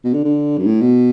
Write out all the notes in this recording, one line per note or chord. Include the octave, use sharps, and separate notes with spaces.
B2
D3
D3
F#2
A2
B2